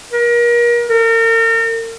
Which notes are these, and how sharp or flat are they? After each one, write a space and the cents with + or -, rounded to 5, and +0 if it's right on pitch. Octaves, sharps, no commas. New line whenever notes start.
A#4 +35
A#4 -40